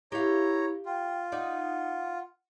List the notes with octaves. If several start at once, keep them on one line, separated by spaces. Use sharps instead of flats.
E4 G4 C#5 F5 A#5
F4 G5
D#4 D5 F#5